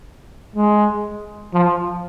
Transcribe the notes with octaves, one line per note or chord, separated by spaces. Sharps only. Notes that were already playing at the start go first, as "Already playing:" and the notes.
G#3
F3